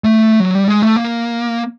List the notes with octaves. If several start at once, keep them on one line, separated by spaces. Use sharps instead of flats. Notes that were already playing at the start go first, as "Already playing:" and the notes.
A3
F#3
G3
G#3
A3
A#3